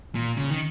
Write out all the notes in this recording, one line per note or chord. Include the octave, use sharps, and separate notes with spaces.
A#2
C#3
D#3